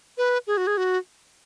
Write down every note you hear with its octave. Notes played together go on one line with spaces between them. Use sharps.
B4
G#4
F#4
G#4
F#4